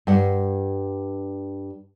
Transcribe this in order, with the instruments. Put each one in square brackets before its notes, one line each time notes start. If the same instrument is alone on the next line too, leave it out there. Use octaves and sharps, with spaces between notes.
[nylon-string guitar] G2 F#5